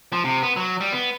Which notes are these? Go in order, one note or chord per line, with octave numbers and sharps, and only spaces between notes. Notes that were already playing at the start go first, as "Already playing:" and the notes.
F3
C3
B3
F#3
G3
B3